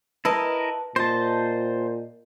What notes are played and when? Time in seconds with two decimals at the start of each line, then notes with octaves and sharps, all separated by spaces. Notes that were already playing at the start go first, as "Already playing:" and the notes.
0.25 E4 A#4 B4 D#5 A5
0.96 A#2 C5 D#5 A5